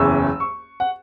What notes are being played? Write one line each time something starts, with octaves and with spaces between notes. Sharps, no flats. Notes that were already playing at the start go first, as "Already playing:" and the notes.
Already playing: F#1 E2 E3 C#4 E6
C#6
F#5